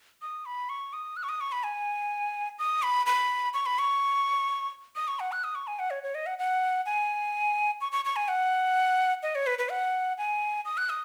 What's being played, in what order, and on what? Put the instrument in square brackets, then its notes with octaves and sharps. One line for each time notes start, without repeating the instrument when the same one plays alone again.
[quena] D#6
B5
C#6
D#6
F#6
C#6
D#6
C#6
B5
G#5
D#6
B5
B5
C#6
B5
C#6
D#6
C#6
F#5
F#6
D#6
C#6
G#5
F#5
C#5
C#5
D#5
F#5
F#5
G#5
C#6
C#6
C#6
G#5
F#5
D#5
C#5
B4
B4
F#5
G#5
D#6
F#6
D#6